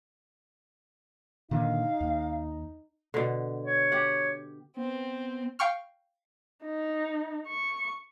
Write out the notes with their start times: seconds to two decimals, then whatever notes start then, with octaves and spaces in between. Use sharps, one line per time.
1.51 A#2 D3 D#3 D#4 F5
2.01 D#2
3.14 B2 D3
3.65 C#5
3.92 G4 F#5
4.77 B3 C4
5.59 F5 G5 C#6 F6
6.64 D#4
7.48 C#6